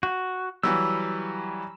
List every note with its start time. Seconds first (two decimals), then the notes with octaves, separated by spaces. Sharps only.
0.03 F#4
0.63 E3 F#3 G3 E6